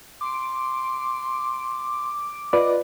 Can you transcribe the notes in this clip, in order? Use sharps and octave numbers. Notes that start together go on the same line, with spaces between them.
C6 D6
F4 B4 D5 D#5